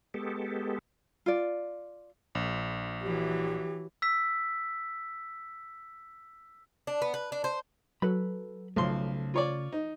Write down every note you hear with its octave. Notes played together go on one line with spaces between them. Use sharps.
G#3 B3 G4 A4
F4 D5
A#1
E3 F#3 G4
E6 B6
D4
B3
B4
D4
C5
F#3 A4 B4 B5
B1 C#3 F3 A3 C6
F4 C#5 D5
D#4